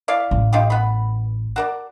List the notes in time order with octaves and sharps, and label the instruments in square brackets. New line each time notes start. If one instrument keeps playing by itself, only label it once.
[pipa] E4 D5 F5
[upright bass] A1
[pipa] D#4 F4 G4
B3 B5
F#4 A#4 D5